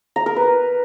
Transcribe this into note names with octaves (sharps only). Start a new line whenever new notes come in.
A#5
A#4
B4